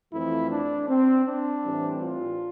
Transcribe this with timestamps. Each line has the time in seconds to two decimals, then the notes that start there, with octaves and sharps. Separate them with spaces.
0.12 F2 E3 A3 C4 E4
0.50 D4
0.89 C4
1.26 D4
1.64 A2 E3 G3 C4
2.02 F4